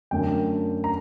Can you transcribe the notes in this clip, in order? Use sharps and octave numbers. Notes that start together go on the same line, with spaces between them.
F#2 D3 A3 G5
A#5